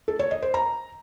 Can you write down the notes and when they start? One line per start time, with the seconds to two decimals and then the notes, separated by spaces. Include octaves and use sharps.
0.08 A4
0.19 C#5
0.31 D#5
0.42 C5
0.54 A#5